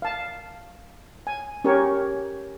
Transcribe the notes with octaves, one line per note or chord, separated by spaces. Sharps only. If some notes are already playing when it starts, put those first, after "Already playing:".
F5 A5
G#5
C#4 G4 A#4 C#5